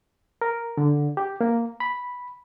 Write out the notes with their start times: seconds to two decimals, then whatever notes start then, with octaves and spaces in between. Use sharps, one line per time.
0.42 A#4
0.77 D3
1.17 G4
1.41 A#3
1.80 B5